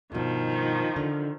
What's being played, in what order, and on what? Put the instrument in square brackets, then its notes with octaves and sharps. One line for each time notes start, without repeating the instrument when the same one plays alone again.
[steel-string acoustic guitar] G2 B2 [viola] D#3 F3
[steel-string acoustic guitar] D3